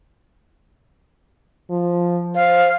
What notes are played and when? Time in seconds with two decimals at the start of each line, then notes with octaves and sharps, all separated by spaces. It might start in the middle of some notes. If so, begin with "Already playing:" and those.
1.70 F3
2.35 C5 F5